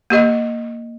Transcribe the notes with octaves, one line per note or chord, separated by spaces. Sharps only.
A#3 G4 D#5